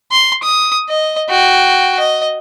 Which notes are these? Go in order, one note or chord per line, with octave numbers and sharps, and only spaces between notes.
C6
D#6
D#5
F#4 G5
D#5